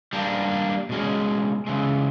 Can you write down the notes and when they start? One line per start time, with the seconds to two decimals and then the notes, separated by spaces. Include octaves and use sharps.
0.13 G3 A#3 D4
0.89 B2 G#3 C#4
1.67 C#3 E3 G#3